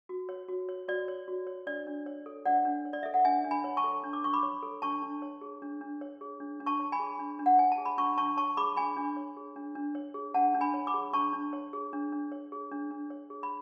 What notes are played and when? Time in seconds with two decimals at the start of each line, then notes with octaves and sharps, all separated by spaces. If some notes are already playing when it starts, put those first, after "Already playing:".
0.09 F#4
0.29 C#5
0.48 F#4
0.69 C#5
0.88 F#4 D5
1.08 C#5
1.28 F#4
1.47 C#5
1.67 D4 D5
1.87 D4
2.06 C#5
2.26 A4
2.46 D4 D5 F#5
2.65 D4
2.85 C#5
2.93 D5
3.03 A4 E5
3.14 F#5
3.25 D4 E5 G#5
3.44 D4
3.51 G#5 B5
3.64 C#5
3.77 A5 C#6
3.84 A4
4.03 D4
4.13 D6
4.24 D4 C#6
4.33 B5 D6
4.43 C#5
4.63 A4
4.82 D4 A5 C#6
5.03 D4
5.22 C#5
5.41 G#4
5.62 D4
5.81 D4
6.01 C#5
6.21 G#4
6.40 D4
6.60 D4
6.66 A5 C#6
6.79 C#5
6.92 G#5 B5
6.99 G#4
7.19 D4
7.39 D4
7.46 F#5
7.58 C#5 G#5
7.72 A5
7.78 G#4
7.85 B5
7.98 D4 A5 C#6
8.18 D4 A5 C#6
8.37 C#5 A5 C#6
8.57 G#4 B5 D6
8.76 D4 G#5 B5
8.96 D4
9.17 C#5
9.37 G#4
9.56 D4
9.75 D4
9.95 C#5
10.14 G#4
10.34 D4 F#5 A5
10.54 D4
10.61 G#5 B5
10.74 C#5
10.87 B5 D6
10.94 G#4
11.13 D4 A5 C#6
11.33 D4
11.53 C#5
11.73 G#4
11.93 D4
12.12 D4
12.32 C#5
12.52 G#4
12.72 D4
12.91 D4
13.10 C#5
13.30 G#4
13.43 B5